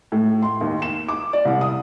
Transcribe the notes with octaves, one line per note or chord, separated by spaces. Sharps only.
A2
C6
D#2
E7
D6
D5
C2
D#6